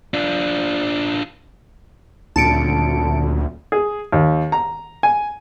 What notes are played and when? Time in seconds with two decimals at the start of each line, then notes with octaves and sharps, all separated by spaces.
0.14 D4 F4
2.36 D#1 D2 D3 A5 C#7 D7
3.72 G#4
4.12 D#2
4.52 A#5
5.03 G#5